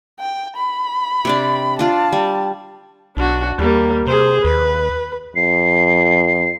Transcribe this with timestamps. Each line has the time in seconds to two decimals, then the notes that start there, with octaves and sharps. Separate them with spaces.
0.20 G5
0.57 B5
1.25 C3 D4 D5
1.79 D4 F4 D5 A5
2.12 G3
3.17 B1 D4 F#4
3.58 D#2 G3 A#3
4.07 C3 G#4 C5
4.44 D#2 B4
5.36 F2 C7